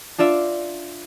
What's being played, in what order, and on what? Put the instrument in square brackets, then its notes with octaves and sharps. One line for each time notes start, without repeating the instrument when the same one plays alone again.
[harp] D4 F4 D5 E5